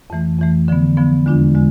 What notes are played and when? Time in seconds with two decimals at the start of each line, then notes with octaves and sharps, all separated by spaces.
0.10 F2 E3 A3
0.39 F2 E3 A3
0.68 D3 F3 B3
0.97 D3 F3 B3
1.26 E2 D3 G#3 D4 F4
1.55 D3 G#3